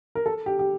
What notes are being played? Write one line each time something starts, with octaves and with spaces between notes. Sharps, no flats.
A#4
A4
G4
G4